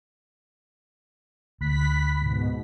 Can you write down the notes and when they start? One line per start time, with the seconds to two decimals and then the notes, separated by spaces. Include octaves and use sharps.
1.61 D2 B5 F#6 B6
2.21 G#2 B2